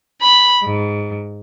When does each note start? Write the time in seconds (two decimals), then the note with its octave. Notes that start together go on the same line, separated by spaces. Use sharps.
0.21 B5
0.64 G#2